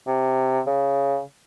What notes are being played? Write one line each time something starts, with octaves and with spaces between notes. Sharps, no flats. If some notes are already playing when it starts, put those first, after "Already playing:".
C3
C#3